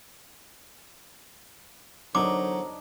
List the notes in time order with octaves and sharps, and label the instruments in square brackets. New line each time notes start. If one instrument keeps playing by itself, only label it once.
[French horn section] E2 D3 C5 [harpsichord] F#3 [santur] D4 D#4 A#4 [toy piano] D6